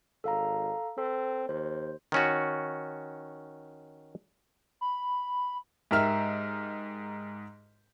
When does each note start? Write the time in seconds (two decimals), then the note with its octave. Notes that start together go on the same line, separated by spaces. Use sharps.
0.24 G#1 A4 F5 A#5
0.98 C4 A4
1.49 D#2 C5
2.12 D#3 C#4 F#4
4.81 B5
5.91 G#2 G4 A#4 E5 F6